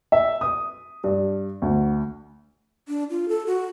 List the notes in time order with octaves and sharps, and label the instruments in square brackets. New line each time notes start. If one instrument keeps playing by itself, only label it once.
[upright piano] E5
D#6
G2
D2
[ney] D4
F4
A4
F#4